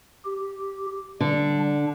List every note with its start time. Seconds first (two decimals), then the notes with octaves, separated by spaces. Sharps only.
0.24 G4
1.20 D3 G3
1.59 D4